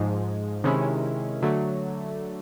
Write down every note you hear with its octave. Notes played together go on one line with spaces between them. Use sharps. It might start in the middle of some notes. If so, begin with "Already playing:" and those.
Already playing: G#2 F3 G#3
C3 D#3 G#3 C#4 E4
D3 F#3 A3